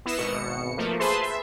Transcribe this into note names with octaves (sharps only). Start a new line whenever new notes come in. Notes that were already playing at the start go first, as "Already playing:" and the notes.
B3 E4 A#6 C7 E7
G#1 B2 C#7
F3 A3 A#3
G#4 B4 C5 E5 A5 C6
E5